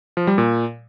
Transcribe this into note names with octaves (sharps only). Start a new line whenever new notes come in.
F3
G3
A#2